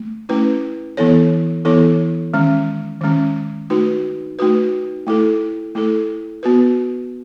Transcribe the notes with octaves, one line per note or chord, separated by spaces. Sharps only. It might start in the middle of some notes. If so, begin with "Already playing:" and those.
Already playing: A3
A3 C#4 E4 B4
E3 B3 E4 A4 C#5
E3 B3 E4 A4 C#5
D#3 G#3 C#4
D#3 G#3 C#4
A3 D#4 F#4 B4
A3 D#4 F#4 B4
A3 E4 A4
A3 E4 A4
B3 F#4 B4